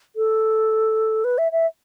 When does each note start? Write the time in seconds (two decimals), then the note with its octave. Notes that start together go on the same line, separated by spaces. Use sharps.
0.16 A4
1.24 B4
1.38 E5
1.52 E5